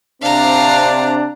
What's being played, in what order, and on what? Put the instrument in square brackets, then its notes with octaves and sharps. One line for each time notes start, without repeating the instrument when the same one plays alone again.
[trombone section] C3 C4 D4 [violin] F5 A#5